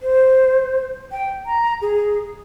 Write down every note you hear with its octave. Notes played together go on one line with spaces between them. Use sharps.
C5
G5
A#5
G#4